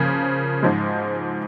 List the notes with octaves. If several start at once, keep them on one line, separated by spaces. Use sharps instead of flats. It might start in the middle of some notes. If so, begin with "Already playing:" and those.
Already playing: C#3 F3 A#3 C#4
G#2 F3 G#3